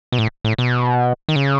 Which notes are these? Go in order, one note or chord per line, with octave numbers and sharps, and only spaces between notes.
B2
A2
A2
B2
D#3
C#3